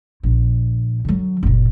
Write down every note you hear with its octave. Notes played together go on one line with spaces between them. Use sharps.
A#1
D3 F#3
F#1 A#2